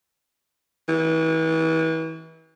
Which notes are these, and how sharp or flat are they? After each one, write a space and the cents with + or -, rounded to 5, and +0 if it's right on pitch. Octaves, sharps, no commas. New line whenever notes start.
E3 -35